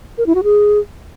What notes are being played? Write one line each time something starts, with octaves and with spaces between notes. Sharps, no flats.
A#4
E4
F#4
G#4